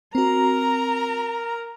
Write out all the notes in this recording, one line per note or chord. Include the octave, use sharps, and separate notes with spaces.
C4 F#4 A#4 A#5